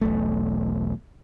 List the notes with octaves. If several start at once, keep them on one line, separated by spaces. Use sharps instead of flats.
E1 B1 A3